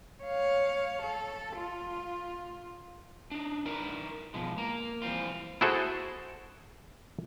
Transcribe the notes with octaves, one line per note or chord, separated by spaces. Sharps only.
C#5 F5
A4
F4
D4 D#4
D#4 E4 A#4 B4 D5
B2 F3 G#3
A#3 A#4
E3 F3 G3 C4 F4
E4 F#4 G#4 A4 C5